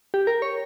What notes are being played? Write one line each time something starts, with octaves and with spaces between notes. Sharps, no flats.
G4
A#4
C#5